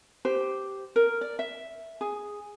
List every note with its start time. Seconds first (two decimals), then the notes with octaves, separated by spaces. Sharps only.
0.25 G4 C5
0.96 A#4
1.21 D5
1.39 E5
2.01 G#4